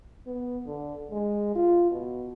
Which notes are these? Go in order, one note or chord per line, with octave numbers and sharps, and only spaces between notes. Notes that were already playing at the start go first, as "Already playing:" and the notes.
B3
D3
G#3
F4
B2